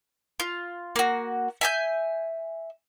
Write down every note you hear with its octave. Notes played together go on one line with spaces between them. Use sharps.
F4
A#3 F#4
E5 G#5 G6